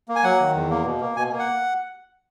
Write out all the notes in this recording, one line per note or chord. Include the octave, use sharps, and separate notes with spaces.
A#3
G#5
F#3 F#5
D#3
E2
A#3
B2
A#3
B2 G#5
A#3
F#5